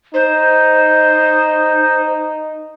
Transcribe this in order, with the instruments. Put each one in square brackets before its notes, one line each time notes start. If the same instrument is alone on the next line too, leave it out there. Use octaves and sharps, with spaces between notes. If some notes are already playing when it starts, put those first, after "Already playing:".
[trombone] D#4 [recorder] C5